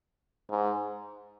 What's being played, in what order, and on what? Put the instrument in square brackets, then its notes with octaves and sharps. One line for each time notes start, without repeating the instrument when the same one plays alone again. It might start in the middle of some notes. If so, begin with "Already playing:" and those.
[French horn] G#2